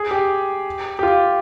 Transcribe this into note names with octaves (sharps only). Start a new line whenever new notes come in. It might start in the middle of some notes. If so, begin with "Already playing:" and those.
Already playing: G#4
G4
G4
F4